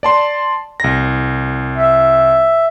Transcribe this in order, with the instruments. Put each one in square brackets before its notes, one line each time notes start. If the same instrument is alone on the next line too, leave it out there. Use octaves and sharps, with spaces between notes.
[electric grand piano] D5 A5 C6
C2 A#6
[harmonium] E5